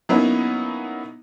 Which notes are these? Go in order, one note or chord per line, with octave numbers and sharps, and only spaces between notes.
F#3 A#3 B3 C#4 D#4 E4